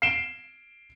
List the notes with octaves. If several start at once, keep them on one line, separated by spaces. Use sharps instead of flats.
C7 D7 E7 G7